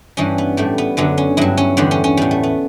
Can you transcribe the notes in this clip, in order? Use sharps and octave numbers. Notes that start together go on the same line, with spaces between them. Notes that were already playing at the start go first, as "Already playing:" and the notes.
G2 E3 G3 C#4
B3
A2 G3 A3
B3
F#2 D3 F#3 B3
C#4
G2 F#3 E4
C#4
E2 D3 G3 B3
C#4
C#4
A2 G3 B3
A3
B3